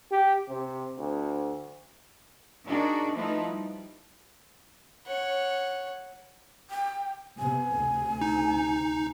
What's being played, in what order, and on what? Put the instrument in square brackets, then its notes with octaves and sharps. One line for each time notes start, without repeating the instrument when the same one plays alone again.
[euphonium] G4
C3
D2
[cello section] D4 D#4 F#4 G#4 A#4 D5
F3 A3 D#4 E4 B4
G3
[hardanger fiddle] C#5 F#5
[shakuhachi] G5
[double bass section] C3 B3 [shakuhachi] G#5
[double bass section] D2 C3
[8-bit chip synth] D#4